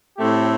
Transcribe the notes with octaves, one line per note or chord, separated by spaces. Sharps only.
A2 A3 C4 G4